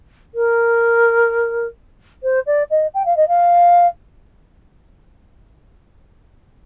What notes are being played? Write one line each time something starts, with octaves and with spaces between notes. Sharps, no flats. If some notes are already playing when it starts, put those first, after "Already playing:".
A#4
C5
D5
D#5
G5
F5
D#5
F5